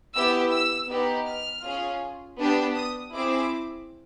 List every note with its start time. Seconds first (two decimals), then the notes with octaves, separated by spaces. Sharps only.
0.14 B3 E4 G4 E6
0.51 E6
0.89 B3 D#4 G4
1.26 F6
1.63 C#4 F4 G#4
2.38 B3 D4 G4
2.75 D#6
3.12 C4 E4 G#4 D6